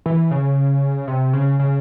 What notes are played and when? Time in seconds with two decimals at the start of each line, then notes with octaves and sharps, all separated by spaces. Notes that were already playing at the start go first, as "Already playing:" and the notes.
0.06 E3
0.31 C#3
1.07 C3
1.33 C#3
1.59 C#3